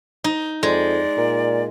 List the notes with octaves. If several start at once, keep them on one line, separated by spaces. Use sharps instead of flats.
D#4
F2 G#3 D5
A#2